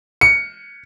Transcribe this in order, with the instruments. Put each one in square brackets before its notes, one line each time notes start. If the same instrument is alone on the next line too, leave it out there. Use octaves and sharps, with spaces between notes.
[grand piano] C#7